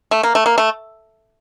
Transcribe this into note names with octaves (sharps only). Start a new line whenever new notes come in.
A3
A#3
A3
A#3
A3